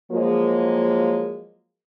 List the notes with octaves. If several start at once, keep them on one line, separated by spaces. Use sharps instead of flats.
F3 F#3 G#3 A#3